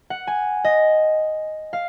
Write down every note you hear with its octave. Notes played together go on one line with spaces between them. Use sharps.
F#5
G#5
D#5
F5